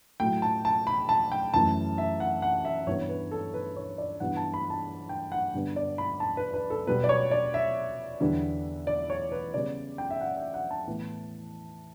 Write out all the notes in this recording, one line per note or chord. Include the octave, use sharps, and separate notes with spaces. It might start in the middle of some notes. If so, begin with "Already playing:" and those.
A2 F#3 A3 G5
A5
A5
B5
A5
G5
F#2 E3 A3 A5
E5
F#5
F#5
E5
G2 E3 G3 B3 C#5
B4
A4
B4
C#5
D5
G2 E3 G3 B3 F#5
A5
B5
A5
G5
F#5
G2 D3 G3 B3
D5
B5
A5
B4
B4
A4
B2 G3 B3 B4
D5
C#5
D5
E5
E2 D3 G3 B3
D5
C#5
B4
C#3 G3 B3 D5
G5
E5
F#5
E5
F#5
A5
A2 E3 B3